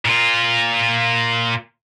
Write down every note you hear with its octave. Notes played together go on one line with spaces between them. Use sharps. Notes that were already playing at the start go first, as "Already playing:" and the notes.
A#2 F4